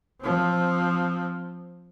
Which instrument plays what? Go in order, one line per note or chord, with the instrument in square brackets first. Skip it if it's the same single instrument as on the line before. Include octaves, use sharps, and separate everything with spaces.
[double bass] F3 C4